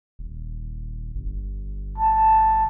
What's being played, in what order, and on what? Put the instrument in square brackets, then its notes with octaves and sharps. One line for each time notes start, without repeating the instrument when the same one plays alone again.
[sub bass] D#1
G1
[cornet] A5